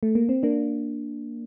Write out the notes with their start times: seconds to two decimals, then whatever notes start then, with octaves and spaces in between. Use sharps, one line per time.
0.03 A3
0.15 A#3
0.29 C4
0.43 A#3 D4